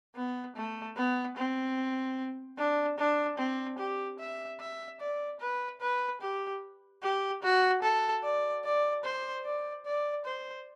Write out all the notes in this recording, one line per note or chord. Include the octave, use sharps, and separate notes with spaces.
B3
A3
B3
C4
D4
D4
C4
G4
E5
E5
D5
B4
B4
G4
G4
F#4
A4
D5
D5
C5
D5
D5
C5